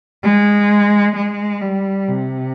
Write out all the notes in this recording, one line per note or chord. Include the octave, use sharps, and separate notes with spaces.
G#3
G#3
G3
C3